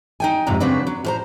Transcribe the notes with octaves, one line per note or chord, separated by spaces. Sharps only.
D#4 G5 G#5
F2 G#2 C3 A#5
C#3 F#3 C4 D4 B4
F#3
A2 C5 A#5